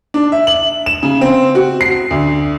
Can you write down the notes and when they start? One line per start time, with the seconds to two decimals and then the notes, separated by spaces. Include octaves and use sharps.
0.14 D4
0.32 E5
0.47 F#7
0.86 E7
1.03 C#3
1.21 C4
1.55 F#4
1.81 C7
2.11 D2